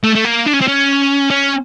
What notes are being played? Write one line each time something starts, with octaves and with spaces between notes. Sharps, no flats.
A3
A3
A#3
D4
C#4
C4
C#4
C#4